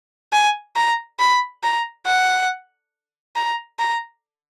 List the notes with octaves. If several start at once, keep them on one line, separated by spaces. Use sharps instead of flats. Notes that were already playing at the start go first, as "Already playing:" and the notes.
G#5
A#5
B5
A#5
F#5
A#5
A#5